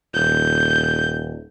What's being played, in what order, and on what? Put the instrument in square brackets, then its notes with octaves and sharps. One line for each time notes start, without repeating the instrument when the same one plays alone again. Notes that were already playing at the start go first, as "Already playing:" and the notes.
[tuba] D#1 [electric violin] G6